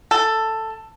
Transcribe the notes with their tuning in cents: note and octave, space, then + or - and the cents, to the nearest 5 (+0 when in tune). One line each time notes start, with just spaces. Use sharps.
A4 +10